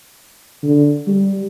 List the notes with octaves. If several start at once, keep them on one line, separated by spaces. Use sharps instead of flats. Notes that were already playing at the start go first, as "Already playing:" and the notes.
D3
G3